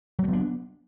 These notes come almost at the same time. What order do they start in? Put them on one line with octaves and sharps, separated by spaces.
F#3 A3 B3 D4